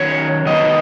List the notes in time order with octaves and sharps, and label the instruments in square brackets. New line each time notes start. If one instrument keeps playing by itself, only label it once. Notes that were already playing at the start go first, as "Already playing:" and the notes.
Already playing: [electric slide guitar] D#3 F#3 C#4 C#5
D#3 F#3 B3 D#5